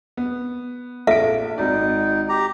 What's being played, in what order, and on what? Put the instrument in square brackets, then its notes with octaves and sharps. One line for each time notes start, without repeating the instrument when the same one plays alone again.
[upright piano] B3
[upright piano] A#1 D7 [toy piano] A4 E5 F5
[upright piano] G#1 D5 [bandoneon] D#4
[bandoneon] G4 A#5